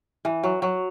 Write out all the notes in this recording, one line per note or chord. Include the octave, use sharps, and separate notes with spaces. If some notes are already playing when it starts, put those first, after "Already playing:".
E3
F#3
F#3